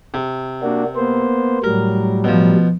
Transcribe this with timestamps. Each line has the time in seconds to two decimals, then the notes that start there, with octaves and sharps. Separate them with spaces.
0.14 C3
0.63 A#3 D4 F#4
0.96 A#3 B3 C5
1.64 A2 F#3 G3 A#4
2.24 B2 F3